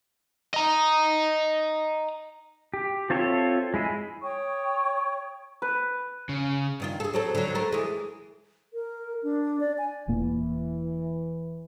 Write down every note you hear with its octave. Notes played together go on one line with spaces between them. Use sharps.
D#5 A#5
G4
C4 F4 A4 C#5 E5
G#3 E4 G#4
C#5 G5 C#6 D#6
B4
C#3
G2 D#3 F4
G#4 A4
F#3 C4 A4
D3 F#3
A3 A4 A#4
E3 G#3
A#4
D4
D5
G#5
E1 A#2 E3 A#3